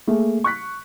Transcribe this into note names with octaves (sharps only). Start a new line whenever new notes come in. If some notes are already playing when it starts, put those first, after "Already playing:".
A3 A#3 G#4
C#6 F#6 B6